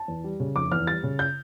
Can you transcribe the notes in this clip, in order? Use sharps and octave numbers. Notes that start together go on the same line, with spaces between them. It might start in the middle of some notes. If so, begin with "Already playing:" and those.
Already playing: A5
E2
G3
C#3
F1 D6
E2 F6
G3 A6
C#3
G6